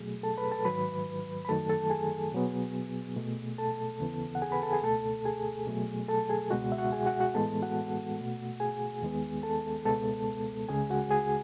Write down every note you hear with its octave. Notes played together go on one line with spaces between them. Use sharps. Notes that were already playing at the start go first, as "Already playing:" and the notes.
Already playing: B2 F#3 A3 G#4
A4 A5
B4 B5
A4 A5
G#2 D#3 F#3 B4 B5
B5
F#2 D#3 F#3 A3 A4 A5
A4 A5
G#4 G#5
B2 F#3 B3
B2 A3
A4 A5
D#2 C#3 E3 B3
F#5
G#4 G#5
B4 B5
A4 A5
G#4 G#5
C#2 B2 A3 A4 A5
G#4 G#5
B2 F#3 A3
A4 A5
G#4 G#5
C#2 B2 G#3 F#4 F#5
E5
F#4 F#5
G#4 G#5
F#4 F#5
F#4 F#5
A2 E3 G#3 B3 A4 A5
F#4 F#5
B2 A3
G#4 G#5
D#2 D#3 G#3 B3
A4 A5
C#2 B2 G#3 B3 A4 A5
C#2 C#3 G#3 G#4 G#5
F#4 F#5
G#4 G#5